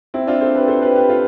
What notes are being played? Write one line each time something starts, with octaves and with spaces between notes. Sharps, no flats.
C4 E4
D4 F4
A4 C5
G4 B4
A4 C5
G4 B4
G4 B4
F4 A4